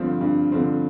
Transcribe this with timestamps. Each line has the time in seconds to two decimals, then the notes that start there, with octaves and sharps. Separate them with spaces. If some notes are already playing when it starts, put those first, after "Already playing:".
Already playing: G2 D3 F3 C4
0.21 G2
0.52 D3 F3 C4